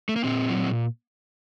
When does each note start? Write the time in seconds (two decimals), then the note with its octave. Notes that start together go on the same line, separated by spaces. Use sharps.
0.09 A3
0.16 A#3
0.24 A#2 C4
0.49 F#3